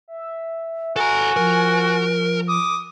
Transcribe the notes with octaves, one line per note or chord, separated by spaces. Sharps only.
E5
F#4 A4 G#5 A#5
F3 A#4
D6 D#6